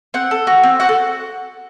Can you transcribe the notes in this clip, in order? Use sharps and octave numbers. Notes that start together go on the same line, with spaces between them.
C4 F#5
A4
F#4
C4
F#4 F#5
A4